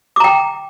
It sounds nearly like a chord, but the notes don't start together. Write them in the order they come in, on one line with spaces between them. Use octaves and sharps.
D6 A#5 G5